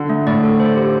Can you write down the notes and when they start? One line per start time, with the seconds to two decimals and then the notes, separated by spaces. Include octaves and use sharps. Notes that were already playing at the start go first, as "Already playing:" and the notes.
Already playing: D3
0.10 A3
0.27 A2 D5
0.43 A4
0.60 C5
0.76 G4